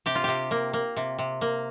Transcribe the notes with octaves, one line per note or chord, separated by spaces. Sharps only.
C3 G4
F4
C3 G4
A#3
A#3
C3
C3
A#3